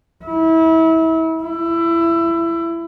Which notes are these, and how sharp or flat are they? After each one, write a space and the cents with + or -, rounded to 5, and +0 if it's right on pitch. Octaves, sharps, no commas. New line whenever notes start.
E4 -30
E4 +20